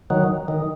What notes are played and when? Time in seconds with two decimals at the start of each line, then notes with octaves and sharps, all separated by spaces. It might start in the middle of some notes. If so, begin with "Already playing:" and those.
0.10 D#3 F#3
0.48 D#3